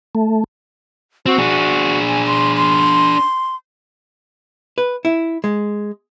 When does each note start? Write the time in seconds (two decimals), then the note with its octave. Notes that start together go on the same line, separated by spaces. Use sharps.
0.15 A3
1.26 C4 F#4
1.38 D4 G#4
2.08 G#5
2.27 C6
2.56 C6
4.78 B4
5.05 E4
5.44 G#3